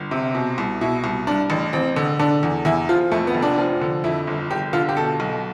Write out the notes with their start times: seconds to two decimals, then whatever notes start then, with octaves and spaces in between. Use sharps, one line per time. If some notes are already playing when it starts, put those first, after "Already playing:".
Already playing: G1
0.11 C3
0.35 B2
0.58 C2
0.81 B2 E4
1.04 C2
1.27 G2 D4
1.50 A1
1.73 A1 C4
1.96 D3
2.19 D3 D4
2.43 E2
2.65 E2 E4
2.89 F3 F4
3.12 F2 A3
3.27 B3
3.35 F1
3.42 D4
3.59 F3
3.81 D3
4.04 F2 E4
4.27 G1
4.51 G1 G4
4.73 D3 F4
4.89 G4
4.97 B2 A4
5.20 B1